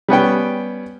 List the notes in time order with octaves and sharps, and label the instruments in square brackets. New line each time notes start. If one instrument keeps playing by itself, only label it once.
[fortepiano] G3 B3 C#4 G5